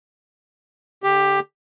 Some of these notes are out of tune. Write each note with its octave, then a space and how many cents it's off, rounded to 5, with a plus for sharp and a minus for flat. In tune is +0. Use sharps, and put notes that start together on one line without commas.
D3 -15 G4 +10